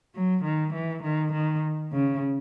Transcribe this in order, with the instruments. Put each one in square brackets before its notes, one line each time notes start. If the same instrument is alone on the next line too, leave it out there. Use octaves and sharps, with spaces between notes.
[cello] F#3
D#3
E3
D#3
D#3
C#3